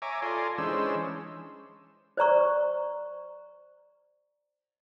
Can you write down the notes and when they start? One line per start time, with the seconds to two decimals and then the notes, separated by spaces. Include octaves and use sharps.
0.02 C#5 E5 G#5 A#5 D6
0.22 F4 A4 D5 G#5 A#5 C6
0.58 E3 G#3 C#4 D4 C5 E6
2.17 C5 D5 A#5 C#6